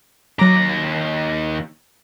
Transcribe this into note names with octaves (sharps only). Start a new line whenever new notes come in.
D#2 F#3 A#5 D6